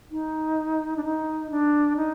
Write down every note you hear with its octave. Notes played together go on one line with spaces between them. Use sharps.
D#4
D4
D#4
D4
D#4